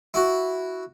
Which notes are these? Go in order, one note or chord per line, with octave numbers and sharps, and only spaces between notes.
E4 F#4